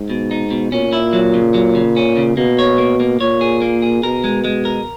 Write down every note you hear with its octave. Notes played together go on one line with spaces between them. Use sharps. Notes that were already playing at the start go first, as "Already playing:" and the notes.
Already playing: G#2
B2
D#4
B2
A#2 C#4
E4
F#3
C#3
F#3
C#3
C#4
C#3
B2 A#3
C#5
A#3
A#3
A#2 C#5
G#4
A#3
G#4
B2 A#4
G#3
G#3
A#4